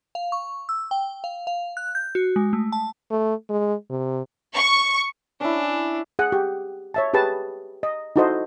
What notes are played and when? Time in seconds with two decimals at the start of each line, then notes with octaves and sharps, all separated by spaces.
0.15 F5
0.32 C#6
0.69 E6
0.91 G5
1.24 F5
1.47 F5
1.77 F#6
1.95 G6
2.15 F#4
2.36 G#3
2.53 A3
2.72 A5
3.11 A3
3.50 G#3
3.90 C3
4.55 C#6
5.41 C#4 D4 E4
6.19 G#4 F#5
6.32 G4
6.94 C#5 E5 A5
7.14 G4 G#4 B4 A5
7.83 D#5
8.16 D#4 E4 F#4 A4 C5 D#5